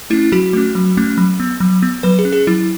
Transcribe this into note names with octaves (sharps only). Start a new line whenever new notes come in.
A3 C#4 E4
F#3 F#4
A3 C#4
F#3
A3 C#4
F#3
B3
F#3
B3
F#3 B4
G#4
C#4
G#4
F#3 E4